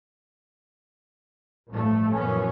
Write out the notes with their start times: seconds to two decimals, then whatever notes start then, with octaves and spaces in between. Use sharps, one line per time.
1.71 A1 G2 F3 A3
2.17 A#1 F#2 E3 F3 B3 C#4